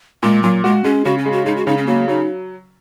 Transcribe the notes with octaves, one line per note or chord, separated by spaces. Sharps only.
A#2 G#3
A#2 F#3
G#3 F#4
G#3 C#4
C#3 F#4
C#4
G#3
F#4
G#3 D#4
F#4
C#3 D#4
C#4
F#3 A#3
F#3 D#4